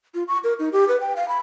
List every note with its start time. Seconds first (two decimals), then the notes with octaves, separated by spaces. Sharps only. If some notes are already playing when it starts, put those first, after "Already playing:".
0.14 F4
0.28 C#6
0.44 A#4
0.59 D#4
0.72 G4
0.88 B4
1.00 G5
1.16 F5
1.28 B5